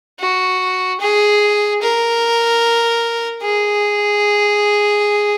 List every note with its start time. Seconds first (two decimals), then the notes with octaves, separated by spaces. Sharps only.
0.20 F#4
1.01 G#4
1.82 A#4
3.42 G#4